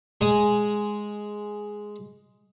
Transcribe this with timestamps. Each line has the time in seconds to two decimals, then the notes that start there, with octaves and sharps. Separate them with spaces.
0.21 G#3 G#5 D#6